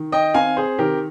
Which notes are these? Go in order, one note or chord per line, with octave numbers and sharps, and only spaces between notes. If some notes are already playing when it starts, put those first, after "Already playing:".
Already playing: D#3
D#5 G5
C4 F5 G#5
G#4 C5
D#3 G4 A#4